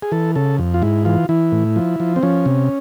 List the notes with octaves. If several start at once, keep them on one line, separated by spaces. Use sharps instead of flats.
G#4
E3 A4
C#3 A4
F2
F4
G#2 E4
E3 F4
E3 E4
A2
F3
F3
C4
F3 C#4
C3